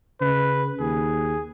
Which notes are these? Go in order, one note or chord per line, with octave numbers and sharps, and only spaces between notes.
C#3 B4
D#2 G#4